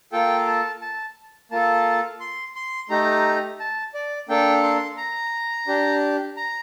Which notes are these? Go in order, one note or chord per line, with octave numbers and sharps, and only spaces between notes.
A#3 F4 A4 G5
A5
A5
A#3 F4 A4 A5
C6
C6
A3 D#4 G4 A#5
A5
D5
A#3 D4 A4 G5
C6
A#5
D4 G4
A#5